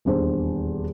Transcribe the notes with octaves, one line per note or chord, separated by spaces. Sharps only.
D#1 E2 D4 C5